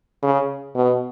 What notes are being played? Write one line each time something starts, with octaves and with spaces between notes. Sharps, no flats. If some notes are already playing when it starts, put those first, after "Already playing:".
C#3
B2